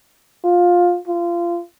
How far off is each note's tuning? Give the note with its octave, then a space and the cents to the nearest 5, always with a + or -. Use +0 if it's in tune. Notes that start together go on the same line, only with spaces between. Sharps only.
F4 +15
F4 -25